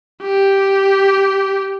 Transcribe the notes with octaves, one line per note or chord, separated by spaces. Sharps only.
G4